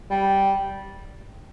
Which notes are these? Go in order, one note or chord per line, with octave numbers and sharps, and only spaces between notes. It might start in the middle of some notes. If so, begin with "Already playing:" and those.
G3